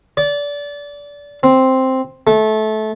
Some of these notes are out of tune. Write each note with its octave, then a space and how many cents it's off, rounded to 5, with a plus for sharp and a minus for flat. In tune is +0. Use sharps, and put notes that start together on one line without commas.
D5 -25
C4 +0
A3 -20